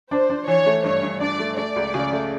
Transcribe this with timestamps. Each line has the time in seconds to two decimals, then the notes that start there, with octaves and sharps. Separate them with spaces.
0.11 D4 C5
0.30 D4
0.47 E3 C#5
0.66 A3
0.84 G2 C#5
1.02 G2
1.20 D4 D5
1.39 A3
1.57 A3 D5
1.76 C#2
1.94 C#3
2.12 A3